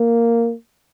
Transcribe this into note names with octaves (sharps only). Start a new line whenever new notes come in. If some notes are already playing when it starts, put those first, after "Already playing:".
Already playing: A#3